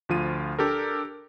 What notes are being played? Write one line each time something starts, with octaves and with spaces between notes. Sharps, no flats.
D2 F3 F4 D#7
D4 G4 A4 A#4